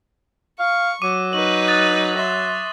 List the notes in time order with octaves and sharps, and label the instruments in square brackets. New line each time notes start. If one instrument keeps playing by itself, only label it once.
[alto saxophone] F5 [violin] C#6
[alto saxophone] F#3 [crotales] D6 D#7
[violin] D#4 B4 [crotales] C#6 D6 F#7
[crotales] D#6 F#6 A6
[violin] E5 C6